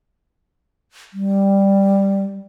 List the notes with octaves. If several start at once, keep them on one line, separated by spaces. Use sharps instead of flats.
G3